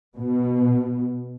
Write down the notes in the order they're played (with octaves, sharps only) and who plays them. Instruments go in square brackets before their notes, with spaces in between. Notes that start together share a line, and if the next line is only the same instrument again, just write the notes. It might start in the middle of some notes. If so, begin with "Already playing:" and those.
[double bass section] B2